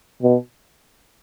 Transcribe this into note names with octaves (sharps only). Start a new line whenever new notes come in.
B2